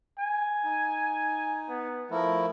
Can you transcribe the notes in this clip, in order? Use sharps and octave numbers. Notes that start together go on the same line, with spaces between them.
G#5
D#4
B3
F3 A3 E4 A#4